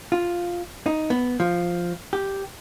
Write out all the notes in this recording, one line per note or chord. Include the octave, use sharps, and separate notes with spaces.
F4
D#4
B3
F3
G4